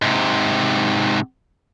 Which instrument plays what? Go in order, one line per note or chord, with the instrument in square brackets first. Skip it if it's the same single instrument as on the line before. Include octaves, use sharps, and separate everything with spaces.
[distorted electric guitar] G#2 C3